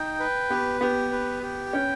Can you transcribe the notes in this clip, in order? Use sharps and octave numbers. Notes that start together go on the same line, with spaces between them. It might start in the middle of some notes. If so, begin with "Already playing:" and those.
Already playing: D#4 G5
B4
B3 G4
B3 G4
B4
G4
C#4 G5